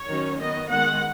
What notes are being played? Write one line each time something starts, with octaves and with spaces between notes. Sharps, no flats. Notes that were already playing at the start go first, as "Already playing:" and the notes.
Already playing: C#5
D#3 F#3 C#4
D#3 B3 D#5
D#3 G#3 B3 F#5